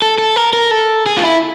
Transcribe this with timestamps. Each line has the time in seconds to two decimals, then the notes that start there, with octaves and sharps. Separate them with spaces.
0.02 A4
0.18 A4
0.36 A#4
0.53 A#4
0.71 A4
1.06 G#4
1.17 F4
1.23 E4